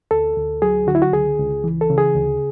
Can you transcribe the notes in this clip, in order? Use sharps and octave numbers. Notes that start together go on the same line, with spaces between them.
D2 A4
D2
F#3 G#4
D3 F#4
E4
F#4
C#2 G#4
C#2
E3
A4
C#3
G#4
D2